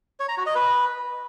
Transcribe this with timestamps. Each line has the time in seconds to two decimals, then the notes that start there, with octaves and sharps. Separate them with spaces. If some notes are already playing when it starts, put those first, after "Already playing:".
0.20 C#5
0.29 A#5
0.37 F#4
0.46 D#5
0.55 B4